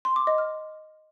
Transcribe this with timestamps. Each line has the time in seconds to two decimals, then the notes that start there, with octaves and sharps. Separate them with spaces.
0.05 C6
0.16 D6
0.27 D#5
0.38 F6